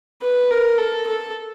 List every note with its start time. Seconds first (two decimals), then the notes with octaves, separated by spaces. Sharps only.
0.22 B4
0.50 A#4
0.78 A4
1.07 A4